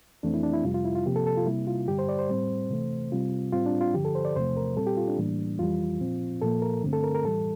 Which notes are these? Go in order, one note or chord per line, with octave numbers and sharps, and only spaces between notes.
F2 E3 A3 C4 D4
E4
D4
E4
F2 C3 G3 F4
F4
E4
F4
C3 F3 A#3 G4
A4
A4
F4
C3 G3 A#3 E4
F4
G2 D3 G3 G4
C5
D5
C5
A2 G3 C4
C3 E3 A3
C3 G3 C4 F4
A2 G3 C4 F4
D4
F4
G2 D3 F3 G4
A4
C5
D5
E2 C3 F3 A3 C5
A#4
A#2 G3 C4 A4
G4
F4
D4
A2 E3 G3 A#3
F2 E3 G3 F4
A#2 F3 C4
A#2 F3 A#3 A4
A#4
G2 D3 A3 C4
A4
A#4
A#4
A2 E3 G3 A4